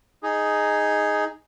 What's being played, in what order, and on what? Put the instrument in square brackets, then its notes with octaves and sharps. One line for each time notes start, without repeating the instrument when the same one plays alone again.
[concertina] D#4 G#4